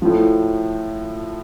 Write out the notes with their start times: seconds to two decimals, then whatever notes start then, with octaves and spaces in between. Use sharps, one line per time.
0.02 A2 F3